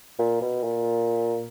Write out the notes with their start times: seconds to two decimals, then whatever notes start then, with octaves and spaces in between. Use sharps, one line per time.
0.19 A#2
0.42 B2
0.64 A#2